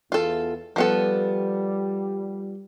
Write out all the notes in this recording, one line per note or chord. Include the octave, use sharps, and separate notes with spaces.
E2 F4 A4
F3 G3 B3 A4